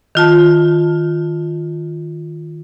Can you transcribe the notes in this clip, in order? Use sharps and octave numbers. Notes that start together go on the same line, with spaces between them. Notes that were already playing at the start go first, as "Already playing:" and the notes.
D#3 F4 A5